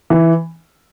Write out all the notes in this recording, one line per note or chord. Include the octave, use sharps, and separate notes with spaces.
E3